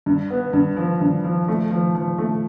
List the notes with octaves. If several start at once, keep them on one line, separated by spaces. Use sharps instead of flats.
G2
B3
G2
F3
G2
F3
A3
F3
F3
A3